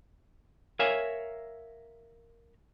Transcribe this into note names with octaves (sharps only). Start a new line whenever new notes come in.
A#4 C#5 E5 F5 G#5